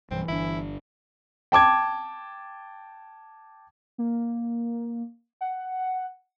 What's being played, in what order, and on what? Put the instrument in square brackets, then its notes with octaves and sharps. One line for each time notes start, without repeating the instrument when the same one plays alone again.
[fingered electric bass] B1 G2 [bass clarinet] E3 [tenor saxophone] C4
[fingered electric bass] G1 D4 [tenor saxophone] E4
[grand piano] G5 A5 D6 G#6
[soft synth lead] A#3
F#5